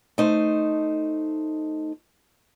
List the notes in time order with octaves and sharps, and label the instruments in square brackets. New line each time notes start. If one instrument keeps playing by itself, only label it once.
[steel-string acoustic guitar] A3 D#4 C5